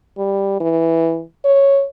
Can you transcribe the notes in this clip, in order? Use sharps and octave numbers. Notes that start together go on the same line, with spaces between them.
G3
E3
C#5